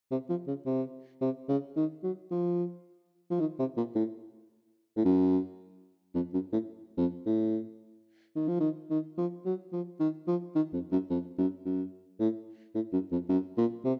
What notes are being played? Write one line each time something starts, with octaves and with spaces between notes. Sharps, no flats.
C3
F3
C#3
C3
C3
C#3
D#3
F#3
F3
F3
D#3
C3
A#2
A2
A2
F#2
F2
F#2
A2
F2
A2
D#3
F3
D#3
D#3
F3
F#3
F3
D#3
F3
D#3
F2
F#2
F2
F#2
F#2
A2
A2
F#2
F2
F#2
A#2
C3